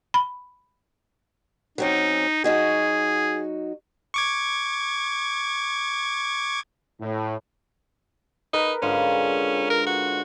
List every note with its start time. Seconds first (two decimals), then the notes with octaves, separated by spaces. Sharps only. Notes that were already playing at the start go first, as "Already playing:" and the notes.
0.14 B5
1.78 F#3 C4 C#4 D#4
2.44 F#3 D#4 F#4 G#4
4.14 C#6 D6 G#6
7.00 A2
8.54 D#4 A#4 B4 B5
8.82 G#2 D3 C#4 F4
9.70 A#4
9.87 F#4